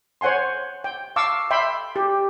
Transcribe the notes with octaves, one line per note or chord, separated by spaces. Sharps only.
C5 C#5 F#5 G#5 C6
G5
F5 A5 C#6 D6 E6
E5 G5 B5 C6
G4